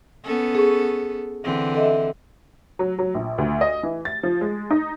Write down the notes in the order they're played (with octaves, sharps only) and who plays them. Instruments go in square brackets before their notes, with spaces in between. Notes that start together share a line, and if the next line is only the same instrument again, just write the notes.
[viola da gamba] B3 C#4 A4
[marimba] G#4 C#6
[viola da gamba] D3 E3 C4
[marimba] A4 D#5 E5
[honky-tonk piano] F#3
F#3
A#1
D2
D#5
E3
A6
F3
G#3
D#4